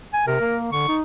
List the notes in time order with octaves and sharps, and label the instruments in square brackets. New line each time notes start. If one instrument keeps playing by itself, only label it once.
[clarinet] G#5
[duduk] C3 [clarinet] A#4
[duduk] A#3
[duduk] D3 [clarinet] C#6
[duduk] D#4